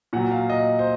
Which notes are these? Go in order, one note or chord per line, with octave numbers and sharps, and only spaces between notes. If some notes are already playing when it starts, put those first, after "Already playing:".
A#2 F#3 F#5
F5
D#5
C5